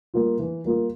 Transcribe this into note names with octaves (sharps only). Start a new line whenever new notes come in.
G3 A#3 F4
E3
G3 A#3 F4